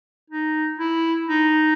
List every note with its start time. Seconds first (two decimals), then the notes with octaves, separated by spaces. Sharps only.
0.30 D#4
0.79 E4
1.29 D#4